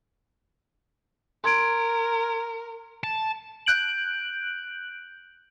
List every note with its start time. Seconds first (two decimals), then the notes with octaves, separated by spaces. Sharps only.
1.44 A#4 C6 G#6 D7
3.04 A5
3.66 F#6 G6 D7 F#7